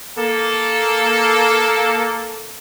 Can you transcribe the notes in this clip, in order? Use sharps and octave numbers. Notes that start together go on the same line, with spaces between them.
A#3 A4